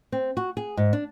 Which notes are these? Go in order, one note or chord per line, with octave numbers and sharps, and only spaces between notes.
C4
F#4
G#4
G#2
D4